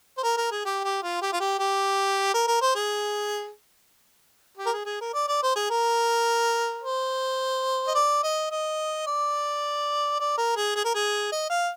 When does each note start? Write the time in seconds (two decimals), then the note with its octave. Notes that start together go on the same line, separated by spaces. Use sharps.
0.17 C5
0.23 A#4
0.37 A#4
0.51 G#4
0.65 G4
0.84 G4
1.03 F4
1.22 G4
1.33 F4
1.40 G4
1.59 G4
2.34 A#4
2.48 A#4
2.62 C5
2.75 G#4
4.57 G4
4.66 A#4
4.73 G#4
4.86 G#4
5.01 A#4
5.14 D5
5.28 D5
5.43 C5
5.56 G#4
5.70 A#4
6.82 C5
7.88 D#5
7.95 D5
8.23 D#5
8.51 D#5
9.07 D5
10.20 D5
10.38 A#4
10.56 G#4
10.75 G#4
10.85 A#4
10.95 G#4
11.32 D#5
11.50 F5